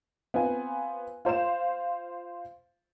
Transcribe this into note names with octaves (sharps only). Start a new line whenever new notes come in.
B3 C4 F4 G#5
F4 C5 F5 E7